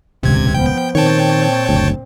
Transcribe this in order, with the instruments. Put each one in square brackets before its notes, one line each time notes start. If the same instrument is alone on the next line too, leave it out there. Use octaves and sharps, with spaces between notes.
[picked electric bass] D#1 C#2 [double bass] G2 [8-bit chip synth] C3 G#6
[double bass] F3 B3 [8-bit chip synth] G5
[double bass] A#2 C4 [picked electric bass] D#3 [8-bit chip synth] C#5 G5 A5
[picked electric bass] F#1 D2